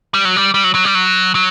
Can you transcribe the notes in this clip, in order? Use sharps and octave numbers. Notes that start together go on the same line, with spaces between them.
G3
F#3
G3
G3
F#3
F#3
G3
F#3
F#3